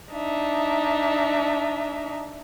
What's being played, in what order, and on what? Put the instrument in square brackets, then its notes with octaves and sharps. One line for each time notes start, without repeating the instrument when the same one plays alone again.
[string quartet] D4 D#4 E5